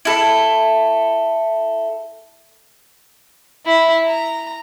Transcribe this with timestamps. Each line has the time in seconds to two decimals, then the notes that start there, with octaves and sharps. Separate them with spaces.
0.05 E4 A4
3.66 E4
4.07 A#5